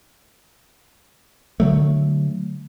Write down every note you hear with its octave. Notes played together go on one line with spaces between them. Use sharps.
D3 F#3 A3